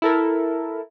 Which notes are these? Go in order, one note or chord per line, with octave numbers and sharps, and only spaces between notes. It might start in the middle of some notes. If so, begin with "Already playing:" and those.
E4 A4 A#4